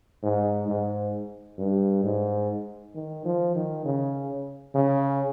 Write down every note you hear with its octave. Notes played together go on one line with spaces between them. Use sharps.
G#2
G#2
G2
G#2
D#3
F3
D#3
C#3
C#3